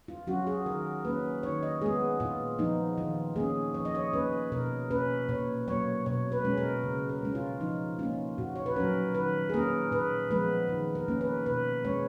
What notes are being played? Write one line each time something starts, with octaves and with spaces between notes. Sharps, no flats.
F4
F#3 C#4 F#4
G#4
D#3 A#4
A#3 C#4 B4
D#3 C#5
D#5
G#3 B3 G#4
A#2 F4
F3 B3 D#4
D#3 F4
A#3 C#4 G#4
F3 C#5
D#5
C#5
A#3 C#4 B4
B2 A#4
A#3 C#4 B4
A#2 C#5
F#3 A#3 C#5
B2 C#5
B4
G#3 C#4
A#4
C#3
A#4
G#3 C#4
F4
F3 D#4
A#3 C#4 F4
A#2 F#4
C#5
B4
F#3 C#4 A#4
D#3 B4
G#4
A#3 C#4 A#4
A#2 B4
F3 G#3 B3 B4
D#3
A#4
A#3 C#4
B4
B2 B4
G#3 C#4 C#5